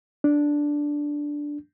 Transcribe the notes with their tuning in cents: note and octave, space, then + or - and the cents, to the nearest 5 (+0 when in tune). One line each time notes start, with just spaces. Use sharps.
D4 -5